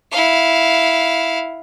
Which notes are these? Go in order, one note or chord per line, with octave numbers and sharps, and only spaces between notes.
E4 F5